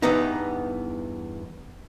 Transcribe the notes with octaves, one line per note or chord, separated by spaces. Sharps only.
E2 G2 E3 B3 D#4